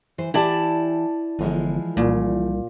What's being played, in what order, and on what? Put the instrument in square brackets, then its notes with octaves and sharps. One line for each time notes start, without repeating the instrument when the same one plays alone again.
[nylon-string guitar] E3 C5
[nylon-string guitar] E3 G4 [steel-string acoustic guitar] E4 D5 A5
[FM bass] G1 [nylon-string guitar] E3 F3 G#3
[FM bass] C2 [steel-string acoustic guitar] A#2